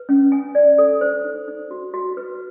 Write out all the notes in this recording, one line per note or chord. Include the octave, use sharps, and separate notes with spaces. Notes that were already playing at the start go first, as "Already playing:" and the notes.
Already playing: B4
C#4
G#5
D5
A4
C5
D#4
D#4
F#4
F#4
B4